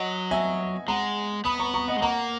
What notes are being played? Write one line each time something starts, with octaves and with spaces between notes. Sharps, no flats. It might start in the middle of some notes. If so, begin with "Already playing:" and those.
Already playing: F#3 D#5 F#5
E5 G#5
G#3 F#5 A#5
B3 B5 D#6
A#5 C#6
A#5 C#6
D#5 F#5
G#3
A#3 F#5 A#5